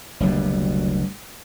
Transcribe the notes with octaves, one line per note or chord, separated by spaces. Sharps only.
F#1 D2 B2 G3